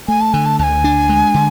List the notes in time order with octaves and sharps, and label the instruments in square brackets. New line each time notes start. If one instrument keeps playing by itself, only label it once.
[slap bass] A3 [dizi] G#5
[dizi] A5
[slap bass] D3 [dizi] G#5
[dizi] A5
[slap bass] D2 [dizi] A5
[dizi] G#5
[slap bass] D4
G#3
D3